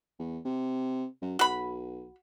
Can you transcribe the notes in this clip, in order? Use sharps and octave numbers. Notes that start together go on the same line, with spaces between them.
E2
C3
F#2
B1 F#4 B5